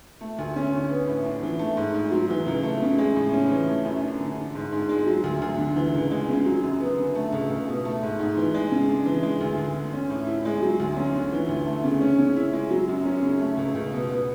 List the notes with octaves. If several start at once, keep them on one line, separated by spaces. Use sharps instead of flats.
A3
D2
C#4
D3
B3
A2
D4
E3
A3
G#2
G#2
F#3
E3
C#2
A3
C#3
G#3
A2
C#4
E3
A3
F#2
D4
D3
D4
G#2
G#2
G#3
F#3
D2
D2
D3
E3
C#2
G#3
C#3
F#3
F#2
B3
D3
A3
C#2
C#2
B2
A3
G#2
G#2
E3
G#3
C#3
D4
E3
G#3
D2
D2
D3
C#4
A2
E4
G#3
F#3
D2
C#4
D3
E3
D2
A3
C#3
C#4
C#3
E4
G#3
F#3
F#2
C#4
C#3
A3
C#2
C#2
B2
B3